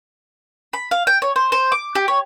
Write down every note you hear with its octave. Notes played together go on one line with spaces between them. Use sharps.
B5
F5
G5
C#5
C5
C5
D6
G4
C#5